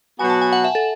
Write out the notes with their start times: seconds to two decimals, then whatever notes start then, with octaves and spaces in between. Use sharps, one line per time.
0.19 B2 F#3 B3 F#4 G#5
0.30 A5
0.41 G#5
0.53 F#5
0.64 E5
0.75 A4